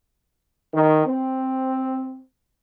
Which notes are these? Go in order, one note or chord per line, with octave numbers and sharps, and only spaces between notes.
D#3
C4